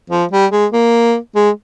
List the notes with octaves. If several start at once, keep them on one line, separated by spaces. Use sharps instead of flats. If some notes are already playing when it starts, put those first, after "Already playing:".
F3
G3
G#3
A#3
G#3